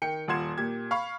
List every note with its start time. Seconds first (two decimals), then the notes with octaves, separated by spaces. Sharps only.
0.02 D#3 G5 C#7
0.28 D#1 F4 F#5 C6 G#6 E7
0.58 A#2 G4 G#6
0.91 F5 B5 C#6